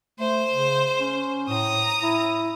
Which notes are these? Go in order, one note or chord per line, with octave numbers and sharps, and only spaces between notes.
A3 C5
C#3
C#4
A2 A#5 D#6
E4